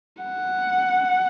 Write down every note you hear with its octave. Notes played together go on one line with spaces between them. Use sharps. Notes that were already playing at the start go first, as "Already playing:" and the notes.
F#5